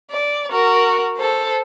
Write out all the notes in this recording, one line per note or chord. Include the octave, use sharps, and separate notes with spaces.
D5
F#4 A#4
A4 C5